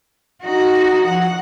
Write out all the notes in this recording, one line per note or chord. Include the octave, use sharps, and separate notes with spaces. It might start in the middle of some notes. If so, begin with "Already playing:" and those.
D#4 F#4
F3 F#5